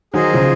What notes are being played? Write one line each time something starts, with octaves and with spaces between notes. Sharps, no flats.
D#3 F#3 G#4 C5 D#5
C#3 F3